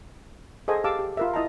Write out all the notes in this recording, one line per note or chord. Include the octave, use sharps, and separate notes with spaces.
G#4 A4 C5 D#5 F#5 G#5
G4 F5 A5 D6 E6
G4
F4 A#4 E5
E4 D#5 A5 A#5